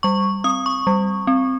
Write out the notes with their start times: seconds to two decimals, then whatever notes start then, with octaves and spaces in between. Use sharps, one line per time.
0.03 G3 C#6
0.44 C4 D#6
0.66 C#6
0.87 G3
1.27 C4